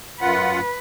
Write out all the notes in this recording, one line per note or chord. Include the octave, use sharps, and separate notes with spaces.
F#2 F4 B4 F#5